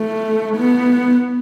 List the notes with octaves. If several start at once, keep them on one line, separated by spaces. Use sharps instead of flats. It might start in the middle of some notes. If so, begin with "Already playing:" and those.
Already playing: A3
B3